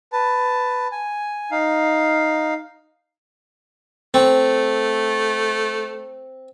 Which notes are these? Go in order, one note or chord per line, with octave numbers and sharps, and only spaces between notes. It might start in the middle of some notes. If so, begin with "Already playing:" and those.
B4 A5
G#5
D#4 F5
A3 C4